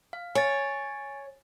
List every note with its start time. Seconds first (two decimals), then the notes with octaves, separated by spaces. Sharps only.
0.13 F5
0.35 C#5 G#5 A6